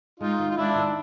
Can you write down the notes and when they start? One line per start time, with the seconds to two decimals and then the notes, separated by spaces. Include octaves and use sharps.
0.20 G#3 D#4 F4
0.39 D#3
0.51 F4
0.57 G#3 D4 E4
0.76 D#3